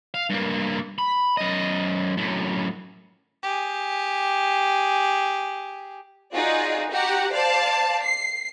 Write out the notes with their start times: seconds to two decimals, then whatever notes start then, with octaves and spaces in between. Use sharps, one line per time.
0.14 F5
0.30 G2 A#3
0.98 B5
1.37 F#2 D#5
2.17 F#2 A2
3.43 G4 G#4
6.33 D#4 F4 F#4 G#4 D5
6.91 F#4 G4 F#5 A#5
7.32 C5 D5 F5 A5
8.01 C7